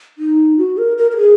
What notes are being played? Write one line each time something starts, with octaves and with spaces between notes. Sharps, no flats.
D#4
F#4
A#4
A#4
A#4
G#4